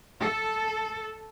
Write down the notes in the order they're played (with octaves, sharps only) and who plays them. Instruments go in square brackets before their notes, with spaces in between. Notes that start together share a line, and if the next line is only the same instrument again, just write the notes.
[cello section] A4